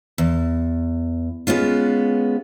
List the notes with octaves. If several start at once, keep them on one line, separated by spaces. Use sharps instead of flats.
E2
G#3 B3 C#4 F4